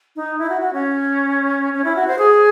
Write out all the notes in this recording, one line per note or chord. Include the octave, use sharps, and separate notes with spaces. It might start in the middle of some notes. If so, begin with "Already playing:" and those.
D#4
E4
F#4
F#4
C#4
C#4
E4
F#4
C5
G#4